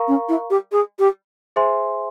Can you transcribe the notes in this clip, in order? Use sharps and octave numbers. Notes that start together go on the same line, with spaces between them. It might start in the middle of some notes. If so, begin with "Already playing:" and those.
Already playing: A#4 F5 A#5 C#6
C#4
E4
G4
G#4
G4
G#4 C5 E5 G#5 C6